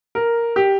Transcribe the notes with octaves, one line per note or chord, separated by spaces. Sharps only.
A#4
G4